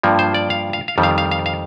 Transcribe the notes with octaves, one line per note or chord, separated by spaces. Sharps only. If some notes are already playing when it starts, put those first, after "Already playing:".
G2 F3 A#3
C5
D5
F5
F5
F5
F2 D#3 G3
F5
F5
F5
F5